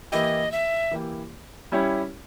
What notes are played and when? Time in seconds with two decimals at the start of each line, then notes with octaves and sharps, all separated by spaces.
0.12 E3 A#3 E4 G4 D#5
0.52 E5
0.91 E3 A#3 E4 G4
1.72 G3 C#4 E4 G4 C#5